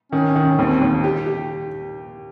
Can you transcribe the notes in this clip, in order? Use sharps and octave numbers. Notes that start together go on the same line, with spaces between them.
D#3 C#4
C#4
D#3
C#4
D#2 C4
D#2
G4
G4